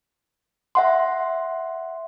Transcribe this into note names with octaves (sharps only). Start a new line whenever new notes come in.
E5 F#5 C6